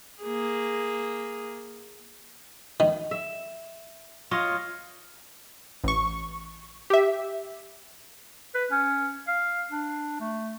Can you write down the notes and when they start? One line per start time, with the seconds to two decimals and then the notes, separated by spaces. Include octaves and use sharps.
0.22 A#3 G#4
2.80 D#3
3.11 E5
4.31 F4 C#5 D#5
5.84 A1 C#6
6.90 G4 E5
8.55 B4
8.71 C#4
9.28 F5
9.71 D4
10.20 A3